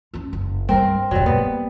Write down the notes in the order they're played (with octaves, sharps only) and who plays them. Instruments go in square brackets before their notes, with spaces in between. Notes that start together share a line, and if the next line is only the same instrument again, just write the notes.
[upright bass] C#4 F4
F#1
[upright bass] G2 G3 [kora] C4 A#4
[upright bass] E1 G2 [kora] F#3 G3
[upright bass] A#3 [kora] B3